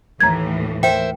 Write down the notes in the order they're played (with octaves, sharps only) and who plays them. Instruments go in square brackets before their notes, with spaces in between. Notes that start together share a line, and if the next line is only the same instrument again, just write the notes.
[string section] D#2 A2 E3 [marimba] A#5 G#6
[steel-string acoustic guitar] A#4 C5 E5 [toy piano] G5